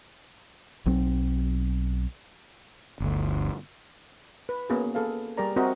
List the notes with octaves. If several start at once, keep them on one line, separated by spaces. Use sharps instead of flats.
B1 F#3 C4
G1 D2
B4
A#3 B3 C#4 F#4 G#4
A#3 G#4 A4 B4 F5
G3 G4 G#4 A#4 D5 A#5
C4 F#4 A#4 D#5 E5